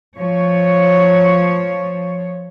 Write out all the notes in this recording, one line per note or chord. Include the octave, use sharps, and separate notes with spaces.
F3 C#5